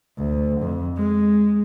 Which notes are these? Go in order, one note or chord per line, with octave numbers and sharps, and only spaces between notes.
D2
F2
G#3